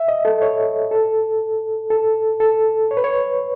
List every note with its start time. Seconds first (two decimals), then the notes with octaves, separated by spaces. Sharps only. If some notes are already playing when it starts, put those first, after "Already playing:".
Already playing: E5
0.08 D#5
0.25 A4
0.42 C#5
0.91 A4
1.90 A4
2.40 A4
2.91 C#5
2.97 B4
3.04 C#5